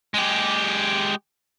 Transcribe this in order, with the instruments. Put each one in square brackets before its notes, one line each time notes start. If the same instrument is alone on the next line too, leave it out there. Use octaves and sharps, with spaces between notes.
[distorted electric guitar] G#3 G4